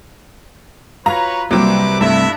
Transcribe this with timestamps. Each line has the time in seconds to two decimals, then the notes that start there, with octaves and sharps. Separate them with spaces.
1.06 F4 F#4 B4 C#5 F5 A#5
1.51 C2 F#3 G3 A#3 C4 B4 D6
2.01 G2 A3 C4 E4 E5